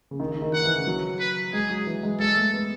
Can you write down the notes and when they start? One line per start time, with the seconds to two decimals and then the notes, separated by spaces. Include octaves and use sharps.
0.11 C#3
0.20 D#3
0.31 D#3
0.42 D#3
0.53 D#3 F#5
0.65 E3
0.76 C#3
0.87 F#3
1.20 B4
1.53 G#3 G#4
1.70 F#3
1.87 E3
2.03 G#3
2.20 G#3 A4
2.37 A3
2.53 B3